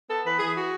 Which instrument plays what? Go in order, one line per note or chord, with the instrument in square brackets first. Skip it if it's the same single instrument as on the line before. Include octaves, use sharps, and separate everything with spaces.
[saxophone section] B3 A4
E3 B4
E3 G#4
F#4